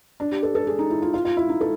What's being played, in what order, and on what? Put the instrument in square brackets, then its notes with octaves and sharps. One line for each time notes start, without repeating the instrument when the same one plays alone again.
[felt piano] D4
G4
A4
A4
G#4
D#4
E4
F4
F4
F4
E4
D#4
A4